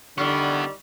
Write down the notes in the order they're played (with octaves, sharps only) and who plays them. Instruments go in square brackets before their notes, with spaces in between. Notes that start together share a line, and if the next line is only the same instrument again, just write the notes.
[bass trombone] D3 [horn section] D#3 G3 [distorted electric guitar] B3 E4 [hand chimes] C#6 F6